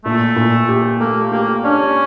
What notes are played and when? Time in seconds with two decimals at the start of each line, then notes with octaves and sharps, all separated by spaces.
0.05 A#2 A3
0.36 A#2
0.69 G4
1.00 A3 A#3
1.32 A#3 G4
1.64 C#4 D4